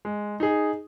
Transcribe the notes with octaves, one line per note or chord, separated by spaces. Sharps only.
G#3
D#4 G#4